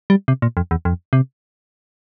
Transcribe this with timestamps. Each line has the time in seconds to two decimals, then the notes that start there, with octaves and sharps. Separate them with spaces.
0.10 G3
0.28 C3
0.42 A#2
0.57 F2
0.71 E2
0.85 F2
1.13 C3